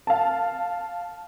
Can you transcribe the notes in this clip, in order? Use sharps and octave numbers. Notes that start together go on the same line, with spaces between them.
F5 A5